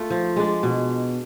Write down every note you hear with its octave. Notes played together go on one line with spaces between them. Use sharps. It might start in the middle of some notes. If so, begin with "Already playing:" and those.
Already playing: A3 F4
F3
G#3 D4
B2